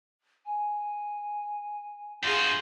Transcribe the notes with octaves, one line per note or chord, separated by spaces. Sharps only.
G#5
G2 F4 F#4 G#4 G6